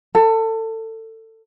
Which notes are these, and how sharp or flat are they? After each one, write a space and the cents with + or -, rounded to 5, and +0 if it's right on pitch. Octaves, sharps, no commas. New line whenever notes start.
A4 +25